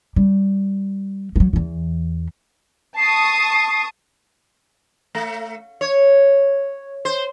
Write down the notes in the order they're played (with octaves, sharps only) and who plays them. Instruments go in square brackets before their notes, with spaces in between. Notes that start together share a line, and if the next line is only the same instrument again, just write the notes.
[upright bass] G3
F3 F#3
E2 E3
[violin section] A5 C#6 D#6 [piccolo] C7
[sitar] A3
C#5
C5